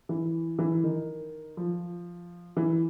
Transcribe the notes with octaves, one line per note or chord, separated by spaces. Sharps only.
E3
E3
D#3
F3
E3